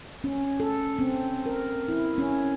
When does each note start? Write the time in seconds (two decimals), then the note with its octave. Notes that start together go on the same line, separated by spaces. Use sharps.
0.24 C#4
0.60 A4
0.99 C4
1.46 A#4
1.88 E4
2.18 C#4